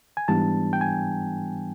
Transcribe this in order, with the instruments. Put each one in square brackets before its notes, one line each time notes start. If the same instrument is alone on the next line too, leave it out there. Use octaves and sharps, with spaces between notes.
[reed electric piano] G#5
G#2 E3 G3 B3 D4 A5
G5
G#5